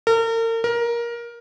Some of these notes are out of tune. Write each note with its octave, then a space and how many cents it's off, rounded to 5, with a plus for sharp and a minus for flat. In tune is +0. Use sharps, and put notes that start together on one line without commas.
A#4 -40
A#4 +15